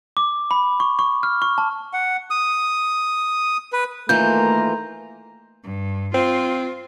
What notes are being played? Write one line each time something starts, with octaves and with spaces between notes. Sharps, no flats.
D6
B5
C#6
C#6
F6
C#6
A5
F#5
D#6
B4
D#3 E3 A3 A#3 F4 A#5 G6
G2
C4 F4